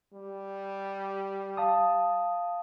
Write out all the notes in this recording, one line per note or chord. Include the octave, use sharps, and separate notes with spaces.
G3
F5 A5 D#6